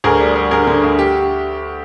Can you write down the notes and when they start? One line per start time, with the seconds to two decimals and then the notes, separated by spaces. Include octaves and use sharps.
0.04 D2 G#4 A#4
0.20 G3
0.36 G3
0.51 D3 G#4 A#4
0.67 D3
0.83 D2
0.99 G4